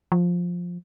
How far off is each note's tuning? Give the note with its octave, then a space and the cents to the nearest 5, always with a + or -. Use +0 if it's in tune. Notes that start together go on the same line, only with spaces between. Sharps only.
F3 +10